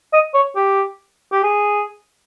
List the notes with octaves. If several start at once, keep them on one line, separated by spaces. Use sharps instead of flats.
D#5
C#5
G4
G4
G#4